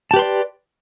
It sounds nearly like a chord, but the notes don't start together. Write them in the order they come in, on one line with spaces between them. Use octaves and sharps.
A5 G4 B4 C6 D5